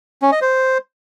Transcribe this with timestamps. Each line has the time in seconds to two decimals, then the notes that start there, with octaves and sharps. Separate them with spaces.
0.22 C#4
0.32 D#5
0.41 C5